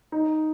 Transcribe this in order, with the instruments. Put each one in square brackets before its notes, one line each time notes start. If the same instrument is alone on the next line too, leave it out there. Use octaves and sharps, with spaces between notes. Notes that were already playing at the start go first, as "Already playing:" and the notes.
[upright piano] D#4